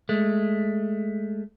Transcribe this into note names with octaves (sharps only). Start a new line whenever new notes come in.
G#3 A3